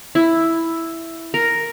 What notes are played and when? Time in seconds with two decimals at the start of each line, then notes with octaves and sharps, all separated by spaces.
0.15 E4
1.34 A#4